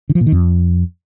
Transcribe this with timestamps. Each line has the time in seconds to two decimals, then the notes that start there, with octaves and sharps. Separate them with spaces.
0.09 D3
0.15 F3
0.21 A#2
0.26 D#3
0.32 F2